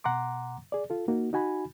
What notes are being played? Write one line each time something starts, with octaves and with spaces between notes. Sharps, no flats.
B2 F#5 A#5 C6 D6
G#4 D5
F4 A4
A#3 D#4 F#4
D#4 F#4 G#5 B5